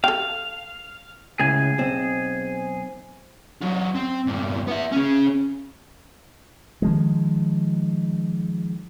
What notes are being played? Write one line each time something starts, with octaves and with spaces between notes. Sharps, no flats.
A4 F5 G5
C#2 A2 C#3 G#4 G#5
B1 C4
F#3 F4
C4
E2 G2
B3 E5
C#4 G#4
D#3 F3 G#3